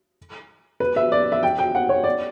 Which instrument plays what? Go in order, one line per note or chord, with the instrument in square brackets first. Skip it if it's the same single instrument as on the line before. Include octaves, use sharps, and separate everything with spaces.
[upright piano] B4
E5
D5
E5
G5
G5
F#5
C#5
D5